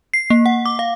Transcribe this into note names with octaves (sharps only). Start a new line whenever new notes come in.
C7
A#3
F#5
D6
F5